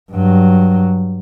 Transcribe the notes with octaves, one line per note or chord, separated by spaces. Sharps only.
G2 F#3